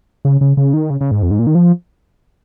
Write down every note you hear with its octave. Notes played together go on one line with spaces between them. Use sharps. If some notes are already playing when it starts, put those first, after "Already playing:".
C#3
C#3
C#3
D#3
C#3
C#3
G#2
F2
G#2
A#2
D#3
F3